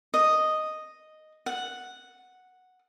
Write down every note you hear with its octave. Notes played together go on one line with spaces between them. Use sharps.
D#5
F#5